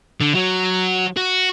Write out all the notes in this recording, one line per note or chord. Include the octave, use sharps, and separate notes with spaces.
D3
F#3
F#4